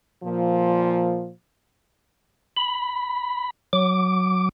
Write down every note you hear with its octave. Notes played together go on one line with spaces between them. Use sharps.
A#2 F3
B5
F#3 D6